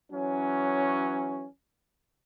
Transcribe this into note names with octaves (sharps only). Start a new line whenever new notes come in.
E3 F#3 C#4